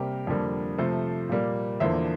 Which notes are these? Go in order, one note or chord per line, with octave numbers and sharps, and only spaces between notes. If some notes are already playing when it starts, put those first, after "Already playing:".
Already playing: C3 G3 A#3 G4 A#4
F2 D3 G3 A#3
C3 F3 A3 A4 C5
A#2 G3 A#3
E2 D3 F3 A#3 C5 E5